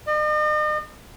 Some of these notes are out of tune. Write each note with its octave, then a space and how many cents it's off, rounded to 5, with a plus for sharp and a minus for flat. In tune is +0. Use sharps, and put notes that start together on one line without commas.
D#5 -45